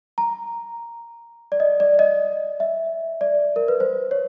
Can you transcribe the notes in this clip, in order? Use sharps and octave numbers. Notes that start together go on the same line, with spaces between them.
A#5
D5
D#5
D5
D#5
E5
D5
A#4
B4
C5
C#5